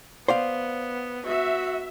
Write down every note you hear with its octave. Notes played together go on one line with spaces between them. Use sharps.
B3 C5 D5 F5
F#4 E5